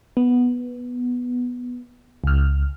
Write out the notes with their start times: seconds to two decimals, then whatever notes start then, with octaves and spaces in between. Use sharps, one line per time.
0.17 B3
2.24 C#2 F6